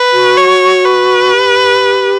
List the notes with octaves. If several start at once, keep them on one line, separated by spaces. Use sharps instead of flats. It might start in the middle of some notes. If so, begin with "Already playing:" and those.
Already playing: B4
F#4
C#5
B4
G4